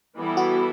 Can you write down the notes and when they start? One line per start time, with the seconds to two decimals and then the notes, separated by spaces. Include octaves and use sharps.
0.17 E3 G3 B3 E4 A4
0.37 F#4